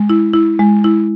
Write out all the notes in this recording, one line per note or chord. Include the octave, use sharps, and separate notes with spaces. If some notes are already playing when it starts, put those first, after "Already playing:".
Already playing: G#3
E4
E4
G#3
E4